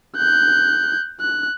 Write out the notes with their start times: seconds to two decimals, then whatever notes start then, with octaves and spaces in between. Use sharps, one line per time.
0.17 F#6 G6
1.21 F#6